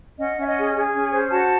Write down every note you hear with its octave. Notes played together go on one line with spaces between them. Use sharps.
C#4 D#5 F#5
C#4 E5
D#5 F#5
G#4
G#4
C#4
C5
F#4 F#5 A5